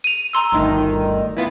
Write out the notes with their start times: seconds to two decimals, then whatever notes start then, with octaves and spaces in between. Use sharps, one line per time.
0.04 D#7 F7
0.33 A#5 C6 E6
0.52 G1 D2 D#3
1.36 E3 B3 F4